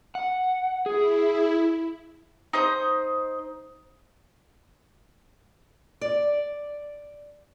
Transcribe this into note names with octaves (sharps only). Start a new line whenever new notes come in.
F#5
E4 G#4
D#4 C5 D#6
D5